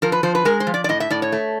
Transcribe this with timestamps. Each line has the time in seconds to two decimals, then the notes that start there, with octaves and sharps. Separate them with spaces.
0.02 F3 A#4
0.12 B4
0.23 F3 C5
0.35 B4
0.45 G#3 A#4
0.60 C5
0.67 F3
0.74 D5
0.84 D5
0.89 A2 D#5
1.00 E5
1.10 A2 D5
1.22 C#5
1.32 A3